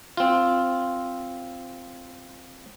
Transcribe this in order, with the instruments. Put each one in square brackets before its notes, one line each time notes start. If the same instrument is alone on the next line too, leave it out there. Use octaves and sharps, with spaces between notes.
[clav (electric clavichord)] C4 F4